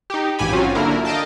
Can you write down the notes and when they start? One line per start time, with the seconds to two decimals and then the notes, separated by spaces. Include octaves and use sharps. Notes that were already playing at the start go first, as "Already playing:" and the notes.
0.10 D#4 G4
0.39 A1 G#2 G4 G#5 B5
0.52 F#3 C4 C#4 F4 F#4
0.75 D3 A#3 D4 E4 A#4
1.05 D#5 F5 G5 A5